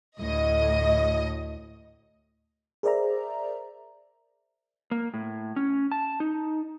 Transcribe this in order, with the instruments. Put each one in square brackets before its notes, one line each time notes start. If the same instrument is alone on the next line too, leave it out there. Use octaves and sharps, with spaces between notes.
[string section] D2 A2 D#5
[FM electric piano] G#4 A#4 C5 D5 E5 A#5
[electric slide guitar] A#3
A2
C#4
A5
D#4